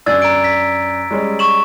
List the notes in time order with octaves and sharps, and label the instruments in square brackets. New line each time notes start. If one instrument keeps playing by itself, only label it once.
[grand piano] F#2 D4 [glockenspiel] E6 G#6 A6
[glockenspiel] A#5 D7
B6
[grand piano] G3 G#3 C#4
[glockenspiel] C#6 E7 F#7